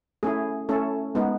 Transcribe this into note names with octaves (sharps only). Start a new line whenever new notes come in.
A3 C#4 E4 G#4
A3 C#4 E4 A4
G#3 B3 D#4